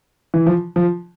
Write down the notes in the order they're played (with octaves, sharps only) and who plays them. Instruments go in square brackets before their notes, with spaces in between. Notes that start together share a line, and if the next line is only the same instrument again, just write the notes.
[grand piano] E3
F3
F3